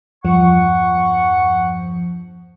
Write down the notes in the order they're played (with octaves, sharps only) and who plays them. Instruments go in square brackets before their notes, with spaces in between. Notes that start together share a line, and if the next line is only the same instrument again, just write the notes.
[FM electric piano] E2 G2 F3 [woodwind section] F#5 C#6